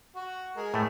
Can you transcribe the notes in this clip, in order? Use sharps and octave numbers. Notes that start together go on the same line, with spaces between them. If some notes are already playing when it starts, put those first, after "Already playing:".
F#4
G#3 A#4
A2 A3